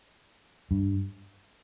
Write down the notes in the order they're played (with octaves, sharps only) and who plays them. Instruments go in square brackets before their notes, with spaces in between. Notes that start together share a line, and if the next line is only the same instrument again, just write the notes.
[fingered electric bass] G2